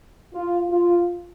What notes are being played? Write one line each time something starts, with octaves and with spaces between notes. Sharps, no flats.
F4
F4